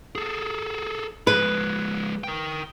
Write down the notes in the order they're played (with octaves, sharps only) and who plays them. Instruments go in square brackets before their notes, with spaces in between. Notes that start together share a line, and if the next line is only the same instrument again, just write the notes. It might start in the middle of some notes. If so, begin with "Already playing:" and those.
[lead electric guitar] G#4 A4
[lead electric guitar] F3 G#3 [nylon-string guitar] B4
[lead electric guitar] A#4 G5